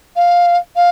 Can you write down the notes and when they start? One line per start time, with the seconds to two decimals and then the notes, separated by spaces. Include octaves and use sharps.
0.15 F5
0.75 F5